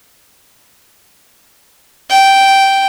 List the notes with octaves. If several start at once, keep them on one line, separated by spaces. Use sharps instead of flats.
G5